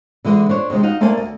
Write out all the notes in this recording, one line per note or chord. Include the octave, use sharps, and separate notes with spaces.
D3 E3 G#3
D4 C5 C#5
A2 C3 D#3 G#3
D#4 F#4 F5
A3 A#3 D4 C5 D5 G#5
D2